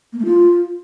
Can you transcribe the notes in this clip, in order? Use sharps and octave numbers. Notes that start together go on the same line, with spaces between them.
A#3
A3
F4